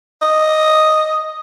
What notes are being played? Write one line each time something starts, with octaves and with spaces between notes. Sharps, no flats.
D#5